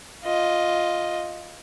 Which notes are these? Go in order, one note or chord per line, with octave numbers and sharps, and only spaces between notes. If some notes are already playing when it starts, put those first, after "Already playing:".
F4 D#5